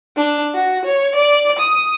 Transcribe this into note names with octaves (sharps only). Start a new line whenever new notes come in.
D4
F#4
C#5
D5
D#6